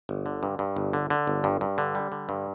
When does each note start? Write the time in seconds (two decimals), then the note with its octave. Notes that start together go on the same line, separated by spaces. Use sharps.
0.09 G1
0.26 D3
0.43 G2
0.59 G2
0.76 G1
0.93 D3
1.10 D3
1.27 G1
1.44 G2
1.61 G2
1.78 D3
1.95 G3
2.12 D3
2.29 G2